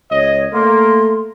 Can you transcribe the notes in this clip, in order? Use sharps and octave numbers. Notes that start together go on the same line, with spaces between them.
C#2 C#5 D#5
A3 A#3 C6